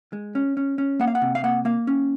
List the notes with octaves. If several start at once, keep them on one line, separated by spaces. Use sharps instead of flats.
G#3
C#4
C#4
C#4
A#3 F#5
F5
F#5
C3
F5
A#3 F#5
A#3 F5
C#4